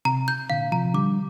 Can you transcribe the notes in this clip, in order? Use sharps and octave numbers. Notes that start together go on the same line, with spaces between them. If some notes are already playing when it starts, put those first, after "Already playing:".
C3 A#5
G6
A#2 D3 F5
C3 F3 A#5
D3 G3 D6